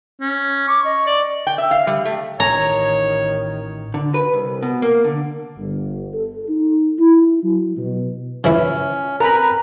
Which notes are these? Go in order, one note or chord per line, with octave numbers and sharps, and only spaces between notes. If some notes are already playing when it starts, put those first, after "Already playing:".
C#4
C#6 D6
D#5
D5
G5
E5
F5
G3
A3
A1 D#3 C#5 A#5
D3
B4
C2
B2
A#3
D3
G1
A4
D#4
E4
F#3
B2
C#3 E3 C#4 E4
C4 A#4 B4 A#5 B5